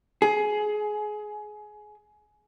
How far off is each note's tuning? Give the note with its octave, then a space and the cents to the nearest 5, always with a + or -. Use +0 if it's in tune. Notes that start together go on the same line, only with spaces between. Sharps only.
G#4 +20